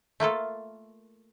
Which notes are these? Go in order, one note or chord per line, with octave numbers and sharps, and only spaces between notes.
A3 A#3 F4 A4